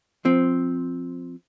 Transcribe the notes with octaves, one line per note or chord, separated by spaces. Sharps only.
F3 C4